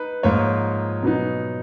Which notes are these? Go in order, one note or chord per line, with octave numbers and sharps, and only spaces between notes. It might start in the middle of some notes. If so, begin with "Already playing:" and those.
Already playing: D#4 B4
G#2 F3 A#3 F4 C#5
B2 F#3 B3 D#4